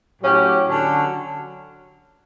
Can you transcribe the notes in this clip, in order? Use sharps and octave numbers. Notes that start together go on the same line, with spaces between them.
A2 F#3 C#4 G4
D3 F#3 C#4